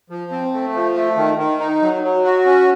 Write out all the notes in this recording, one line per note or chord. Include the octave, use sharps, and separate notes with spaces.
F3
C4
A3
F3
A3
D#3
D#3
D#4
F#3
F#3
F#4
C#4